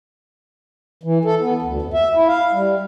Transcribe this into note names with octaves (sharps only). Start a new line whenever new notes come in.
E3
A4
B3
D2
F2
E5
E4
F5
G3